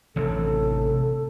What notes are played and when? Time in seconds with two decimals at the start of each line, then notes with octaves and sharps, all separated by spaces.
0.16 A1 C3 E3 A4